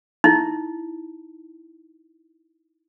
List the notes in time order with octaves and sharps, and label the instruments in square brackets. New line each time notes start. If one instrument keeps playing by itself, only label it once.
[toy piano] D#4 E4